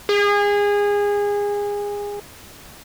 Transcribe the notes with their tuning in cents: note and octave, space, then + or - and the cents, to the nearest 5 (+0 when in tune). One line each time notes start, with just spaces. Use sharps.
G#4 -25